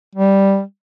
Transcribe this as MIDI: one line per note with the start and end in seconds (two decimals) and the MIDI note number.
0.15 0.61 55